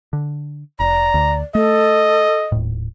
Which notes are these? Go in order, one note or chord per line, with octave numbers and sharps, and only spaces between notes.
D3
F1 D5 A#5
D2
A3 A4 D#5
D#1 A2